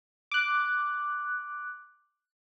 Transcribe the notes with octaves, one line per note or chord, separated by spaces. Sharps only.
D6 F#6